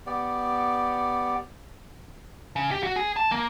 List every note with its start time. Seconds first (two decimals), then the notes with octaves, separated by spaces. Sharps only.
0.06 B3 G4 D5
2.56 C#3
2.71 G4
2.83 F#4
2.96 G#4
3.16 A5
3.32 A#3